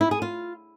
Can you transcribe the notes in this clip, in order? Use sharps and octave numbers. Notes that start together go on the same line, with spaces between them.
E4
G#4
F4